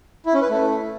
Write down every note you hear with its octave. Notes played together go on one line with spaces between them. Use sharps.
E4
C#4
B4
A3